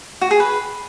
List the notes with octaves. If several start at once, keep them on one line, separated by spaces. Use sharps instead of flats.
F#4
G#4
B4